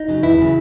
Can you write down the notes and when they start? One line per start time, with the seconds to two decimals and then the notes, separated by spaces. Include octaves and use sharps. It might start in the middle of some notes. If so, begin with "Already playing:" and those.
Already playing: D#4
0.08 C#3 F#3
0.22 E2 E4
0.38 C#3 F#3